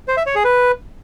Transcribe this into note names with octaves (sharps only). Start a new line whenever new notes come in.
C5
E5
C#5
G#4
B4